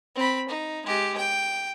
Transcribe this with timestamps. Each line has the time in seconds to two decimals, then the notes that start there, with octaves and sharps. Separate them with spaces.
0.15 C4 B5
0.49 D#4
0.86 G#3 G4
1.17 G5